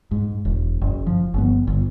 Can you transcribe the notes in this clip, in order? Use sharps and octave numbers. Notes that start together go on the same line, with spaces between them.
G#2
E1
F#1
F3
G1 B3
G1